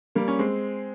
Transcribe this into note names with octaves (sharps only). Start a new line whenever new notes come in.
G3 A#3
C#4
G#3 C4